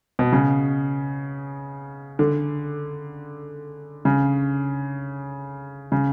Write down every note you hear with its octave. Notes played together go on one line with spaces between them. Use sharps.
B2
C#3
D3
C#3
C#3